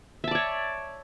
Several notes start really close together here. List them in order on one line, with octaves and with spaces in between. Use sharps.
E5 A5 D5 C#5